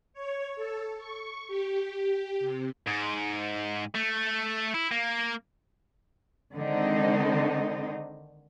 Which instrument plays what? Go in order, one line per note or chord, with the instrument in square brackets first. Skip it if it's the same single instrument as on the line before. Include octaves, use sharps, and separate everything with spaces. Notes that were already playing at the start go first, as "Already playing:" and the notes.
[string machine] C#5
A4
C#6
G4
C3
[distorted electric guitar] G#2
A3
E4
A#3
[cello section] D3 D#3 G#3 C4 D#4